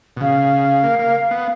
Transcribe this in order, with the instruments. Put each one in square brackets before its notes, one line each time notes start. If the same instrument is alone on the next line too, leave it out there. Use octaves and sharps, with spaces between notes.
[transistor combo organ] B2
[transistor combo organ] C#3 [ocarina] F5
[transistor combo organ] A#3
A#3
B3